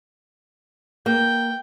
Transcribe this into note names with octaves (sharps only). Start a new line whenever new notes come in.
A#3 G5